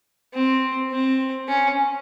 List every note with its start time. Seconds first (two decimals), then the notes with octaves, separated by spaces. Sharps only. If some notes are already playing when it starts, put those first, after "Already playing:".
0.34 C4
0.91 C4
1.48 C#4